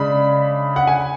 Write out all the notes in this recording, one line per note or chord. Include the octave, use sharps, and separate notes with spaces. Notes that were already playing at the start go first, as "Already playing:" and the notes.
Already playing: C#3 G#3 D4 B5
F#5
G#5